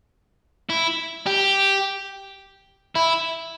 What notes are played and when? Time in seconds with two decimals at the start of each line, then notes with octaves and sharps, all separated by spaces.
0.70 E4
1.26 G4
2.95 E4